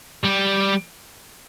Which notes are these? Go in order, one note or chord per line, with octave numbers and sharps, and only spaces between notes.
G3